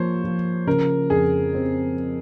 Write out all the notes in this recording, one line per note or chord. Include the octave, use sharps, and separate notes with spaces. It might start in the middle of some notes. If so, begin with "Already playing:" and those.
Already playing: F3 A#3 C5 C#5
F3
C#3 A#4
F2 G#4
C4